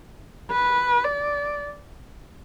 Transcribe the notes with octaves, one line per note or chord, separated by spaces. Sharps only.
B4
D5